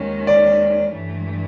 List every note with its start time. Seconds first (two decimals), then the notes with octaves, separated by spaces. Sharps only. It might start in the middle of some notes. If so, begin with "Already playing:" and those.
Already playing: D#2 D#3 G#3 C#4
0.27 D5
0.90 G2 E3 A3